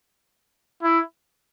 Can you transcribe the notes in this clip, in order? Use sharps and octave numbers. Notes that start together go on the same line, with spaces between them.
E4